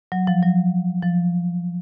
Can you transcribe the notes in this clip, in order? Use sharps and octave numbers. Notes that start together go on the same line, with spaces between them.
F#3
F3
F#3
F3